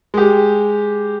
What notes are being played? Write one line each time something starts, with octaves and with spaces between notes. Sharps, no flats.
G#3 G4